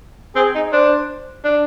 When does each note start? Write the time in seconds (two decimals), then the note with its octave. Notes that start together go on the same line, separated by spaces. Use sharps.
0.36 C4 G#4
0.55 D#4
0.72 D4 C5
1.44 D4